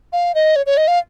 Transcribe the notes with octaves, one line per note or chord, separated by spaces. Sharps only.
F5
D#5
C#5
C#5
D#5
F5